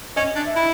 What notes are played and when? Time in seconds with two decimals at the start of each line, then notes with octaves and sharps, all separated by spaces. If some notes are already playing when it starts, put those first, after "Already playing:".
0.16 C#4 D#5
0.36 D4
0.45 E5
0.56 E4